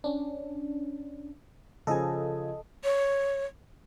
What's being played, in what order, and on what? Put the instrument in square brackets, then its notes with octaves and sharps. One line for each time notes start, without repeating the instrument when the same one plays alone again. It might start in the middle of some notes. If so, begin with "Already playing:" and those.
[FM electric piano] C#4 D4
[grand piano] C#3 F3 G#5 [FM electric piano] A4 D#5
[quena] C#5